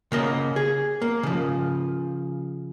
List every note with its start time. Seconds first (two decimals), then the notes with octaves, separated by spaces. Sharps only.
0.12 C#3 A#3 D#5
0.56 G#4
1.02 A#3
1.23 C#3 F3